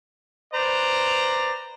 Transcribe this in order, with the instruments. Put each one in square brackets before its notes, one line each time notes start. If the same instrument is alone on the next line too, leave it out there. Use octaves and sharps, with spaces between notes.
[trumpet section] B4 C5 D5 A#5